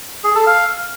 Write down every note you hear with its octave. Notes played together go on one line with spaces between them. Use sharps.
G#4
A4
F5